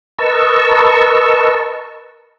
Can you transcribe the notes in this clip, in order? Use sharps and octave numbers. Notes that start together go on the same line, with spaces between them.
A#4 B4 D#5 A5 C#6 E6